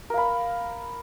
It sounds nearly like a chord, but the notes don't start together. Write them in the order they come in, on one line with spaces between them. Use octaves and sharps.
A#4 F5 B5